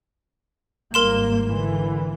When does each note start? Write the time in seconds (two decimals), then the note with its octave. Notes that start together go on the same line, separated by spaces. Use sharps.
0.94 G#1 G2 A#3 A#4 C6 E7
1.53 D3 E3